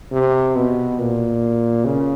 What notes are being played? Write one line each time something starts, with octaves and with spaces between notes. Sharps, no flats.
C3
B2
A#2
C#3